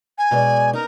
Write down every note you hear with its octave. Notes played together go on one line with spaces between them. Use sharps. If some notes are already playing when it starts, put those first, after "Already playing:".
G#5
B2 G#3 D5
D#4 A#4